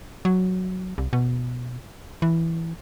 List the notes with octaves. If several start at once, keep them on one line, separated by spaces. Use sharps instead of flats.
F#3
C2
B2
E3